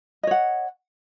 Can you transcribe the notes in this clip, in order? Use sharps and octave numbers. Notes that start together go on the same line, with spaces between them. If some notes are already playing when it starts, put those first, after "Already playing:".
C#5 D#5 F#5